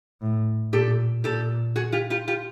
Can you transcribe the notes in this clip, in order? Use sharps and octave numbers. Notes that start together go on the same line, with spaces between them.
A2
A#2 G4 A4
A#2 G4 A4
F#4 G#4
F4 G4
F4 G4
F4 G4